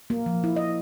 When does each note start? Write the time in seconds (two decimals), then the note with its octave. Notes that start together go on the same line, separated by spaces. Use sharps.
0.10 A#3
0.26 F3
0.44 E4
0.56 D#5